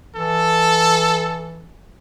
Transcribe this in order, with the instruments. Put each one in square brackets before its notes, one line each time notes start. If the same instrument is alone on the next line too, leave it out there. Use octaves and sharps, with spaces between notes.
[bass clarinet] E3 [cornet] A4